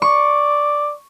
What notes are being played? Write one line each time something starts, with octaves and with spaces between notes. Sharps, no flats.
D5 C#6